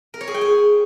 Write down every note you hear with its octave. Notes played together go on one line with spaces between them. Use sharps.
A#4
C#5
G#4
G5
G#4